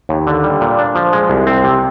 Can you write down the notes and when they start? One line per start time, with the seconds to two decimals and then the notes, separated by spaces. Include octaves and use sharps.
0.09 D#2
0.27 D3
0.44 G3
0.61 A#2
0.78 D4
0.95 F3
1.13 G#3
1.29 C2
1.47 C4
1.64 C3